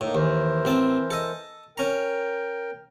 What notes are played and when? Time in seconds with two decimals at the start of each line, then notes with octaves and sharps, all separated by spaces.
0.01 A2 A#3 D#4
0.15 D#2 E3 A#4 C5
0.65 A1 C4 A5
1.10 A4 D#5
1.78 C#4 A#4 G5 A#5